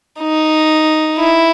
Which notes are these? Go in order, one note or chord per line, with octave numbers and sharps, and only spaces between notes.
D#4
E4